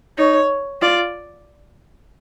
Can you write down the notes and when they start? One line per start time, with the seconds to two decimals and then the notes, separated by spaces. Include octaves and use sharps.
0.18 D#4 C#5
0.82 F4 D5